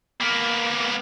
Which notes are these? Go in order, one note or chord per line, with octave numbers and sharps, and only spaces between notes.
A#3 B3